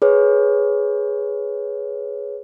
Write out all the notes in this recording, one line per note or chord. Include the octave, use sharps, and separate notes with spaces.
G#4 B4 C#5